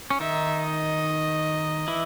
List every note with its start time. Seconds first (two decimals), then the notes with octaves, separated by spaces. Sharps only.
0.10 C#4
0.20 D#3 D#4 E5
0.63 D#5
1.88 E3 E4